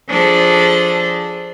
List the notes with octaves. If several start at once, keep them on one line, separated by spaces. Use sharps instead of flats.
F3 D4 G#4 A4